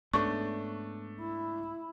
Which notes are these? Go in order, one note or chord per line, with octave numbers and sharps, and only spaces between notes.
G#2 A3 B3 C#4 D4 C#6
E4